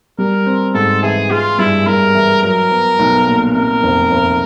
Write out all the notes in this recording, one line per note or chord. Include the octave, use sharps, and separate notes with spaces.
G3 A#4
C4
G#2 A4
E3 G#4
G#3 F4
G2 E4
G2 A#4
E3
F#3 A#4
B3
B1
A#2
C3 A#4
F1
F1